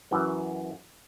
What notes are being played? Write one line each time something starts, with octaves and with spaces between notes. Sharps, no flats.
F#2 E3